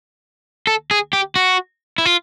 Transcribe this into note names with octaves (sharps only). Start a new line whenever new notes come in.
A4
G#4
G4
F#4
E4
F4